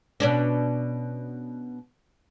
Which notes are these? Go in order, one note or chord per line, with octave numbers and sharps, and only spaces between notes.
B2 C#4 D4